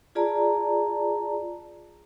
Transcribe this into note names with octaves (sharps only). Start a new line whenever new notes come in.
F4 G#4 D5 A5 A#5